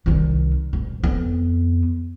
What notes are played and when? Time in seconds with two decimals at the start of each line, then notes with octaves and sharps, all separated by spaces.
0.06 C2 D#3
0.73 D#1
1.04 F2 B3